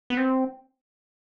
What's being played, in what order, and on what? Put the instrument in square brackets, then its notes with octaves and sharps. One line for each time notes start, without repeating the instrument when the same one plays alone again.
[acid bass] B3
C4